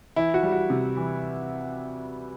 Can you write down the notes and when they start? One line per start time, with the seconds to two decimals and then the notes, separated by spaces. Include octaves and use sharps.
0.16 E3 E4
0.34 F#4
0.43 G3
0.52 F#4
0.70 C3
0.97 E3